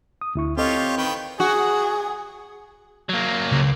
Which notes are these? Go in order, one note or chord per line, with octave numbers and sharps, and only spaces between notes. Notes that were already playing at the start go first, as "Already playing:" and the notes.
D#6
D2 E4 C#6
C4 F4 G4 A4 C#5 D#5
D#3 B4 G5
F#4 G#4
F#3 A#3
C#2